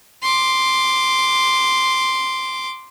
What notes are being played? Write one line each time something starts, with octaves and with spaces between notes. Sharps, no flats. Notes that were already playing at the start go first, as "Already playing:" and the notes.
C6 D6